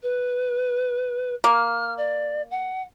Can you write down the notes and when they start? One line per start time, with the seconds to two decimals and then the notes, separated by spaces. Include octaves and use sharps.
0.02 B4
1.44 A#3 F6
1.97 D5
2.50 F#5